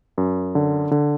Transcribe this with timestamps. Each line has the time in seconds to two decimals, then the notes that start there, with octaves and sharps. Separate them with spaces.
0.18 F#2
0.55 D3
0.91 D3